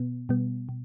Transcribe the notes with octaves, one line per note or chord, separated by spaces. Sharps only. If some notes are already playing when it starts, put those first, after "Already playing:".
Already playing: B2 B3
B2 G3 B3
B2